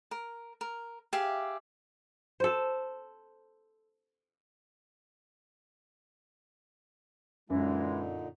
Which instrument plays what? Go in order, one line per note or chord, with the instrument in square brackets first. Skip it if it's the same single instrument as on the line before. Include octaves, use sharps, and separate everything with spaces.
[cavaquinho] A#4
A#4
G4 G#4 E5 F5
[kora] A4 C5
[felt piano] F#2 [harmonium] A#2 D3 D#4 [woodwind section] E3 G#3